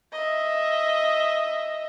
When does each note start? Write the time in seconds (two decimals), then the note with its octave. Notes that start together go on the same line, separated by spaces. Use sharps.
0.12 D#5 E5